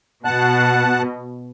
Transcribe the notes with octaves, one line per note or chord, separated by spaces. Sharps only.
B2 F#5 A5 F#6